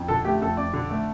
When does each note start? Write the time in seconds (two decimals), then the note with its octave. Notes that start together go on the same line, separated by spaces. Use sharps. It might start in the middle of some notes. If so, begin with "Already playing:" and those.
Already playing: F2
0.08 D3 A4
0.25 A3 G4
0.41 F2 A4
0.57 F2 D5
0.73 D3
0.90 A3